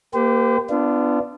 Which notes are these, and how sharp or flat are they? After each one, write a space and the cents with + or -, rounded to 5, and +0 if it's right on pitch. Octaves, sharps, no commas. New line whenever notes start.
A#3 +0 G4 +0 C5 -45
B3 +15 D4 +0 F4 -35